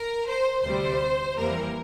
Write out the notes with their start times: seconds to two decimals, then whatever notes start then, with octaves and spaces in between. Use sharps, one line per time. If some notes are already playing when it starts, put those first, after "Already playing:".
Already playing: A#4
0.28 C5
0.63 D2 C3 G3 C5
1.36 F2 E3 G3 A#3 A#4